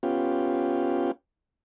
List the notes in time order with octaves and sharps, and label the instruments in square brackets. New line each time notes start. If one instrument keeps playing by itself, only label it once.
[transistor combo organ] B3 C#4 F4 G4